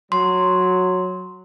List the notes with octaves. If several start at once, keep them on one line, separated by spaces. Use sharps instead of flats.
F#3 C6